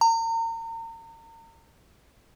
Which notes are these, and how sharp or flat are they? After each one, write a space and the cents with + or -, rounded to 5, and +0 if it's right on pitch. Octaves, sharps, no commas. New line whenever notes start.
A#5 -35